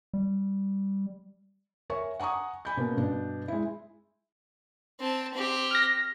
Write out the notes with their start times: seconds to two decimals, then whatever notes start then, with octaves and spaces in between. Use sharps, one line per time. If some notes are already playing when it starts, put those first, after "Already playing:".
0.13 G3
1.90 A#4 C#5 E5 G#5 C#6
2.20 F#5 G#5 A#5 C#6 D#6
2.65 G#5 B5 G6
2.77 B2 A#3 C#4
2.97 G2 B2 D4
3.48 G#3 E4
5.00 C4 A5
5.34 C4 G4
5.71 F6 A#6